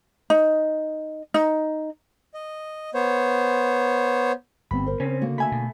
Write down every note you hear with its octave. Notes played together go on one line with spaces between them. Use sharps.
D#4
D#4
D#5
B3 C5 C#5
G1 G3 B3 C4 B5
A#4 C5
C#3 C4 C#4
D3 A#3 F#4
A3 E5 G#5 B5
B2